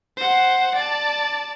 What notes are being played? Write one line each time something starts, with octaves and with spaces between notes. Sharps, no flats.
C5 F#5
D5 A5